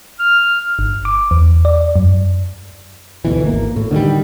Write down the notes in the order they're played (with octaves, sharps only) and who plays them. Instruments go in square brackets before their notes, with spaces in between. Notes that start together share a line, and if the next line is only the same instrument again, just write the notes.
[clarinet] F6
[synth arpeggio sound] G1
D6
E2
D5
F#2
[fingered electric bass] D2 B2 E3
G#1 A#3
A2
D3 D#3 F3 G3